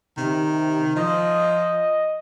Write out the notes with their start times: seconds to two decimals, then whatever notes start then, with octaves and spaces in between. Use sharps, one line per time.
0.17 C3 D#3
0.96 F3 D#5